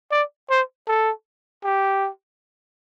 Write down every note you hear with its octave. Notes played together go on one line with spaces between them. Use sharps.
D5
C5
A4
G4